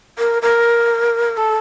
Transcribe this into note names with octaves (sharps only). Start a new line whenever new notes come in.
A#4
A#4
A4